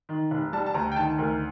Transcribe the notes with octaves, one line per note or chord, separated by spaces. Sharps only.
D#3
F1
G3 A5
A5
D2 A#5
G5
D#3 A5
D2 A#4